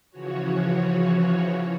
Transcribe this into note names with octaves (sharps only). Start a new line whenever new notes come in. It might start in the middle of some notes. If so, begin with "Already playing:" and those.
C#3 E3 F3 F#4 C#5